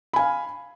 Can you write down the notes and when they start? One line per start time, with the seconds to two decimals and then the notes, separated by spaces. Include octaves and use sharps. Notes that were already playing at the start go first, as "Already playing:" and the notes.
0.13 B5
0.16 G#5
0.19 F5